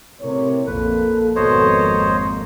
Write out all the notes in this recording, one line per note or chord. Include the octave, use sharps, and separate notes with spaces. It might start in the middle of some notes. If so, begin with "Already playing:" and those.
A2 C3 A#4 C#5
A#1 F2 A#3 A4 B4
G#1 F2 B2 A#3 C5 C#5 D#5